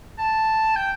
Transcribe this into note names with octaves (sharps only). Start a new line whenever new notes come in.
A5
G5